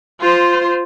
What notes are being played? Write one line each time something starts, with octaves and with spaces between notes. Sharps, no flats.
F4 C5